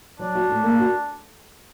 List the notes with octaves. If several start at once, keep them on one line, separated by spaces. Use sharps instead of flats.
F#3 D4
F#4
A2
A#3
F#4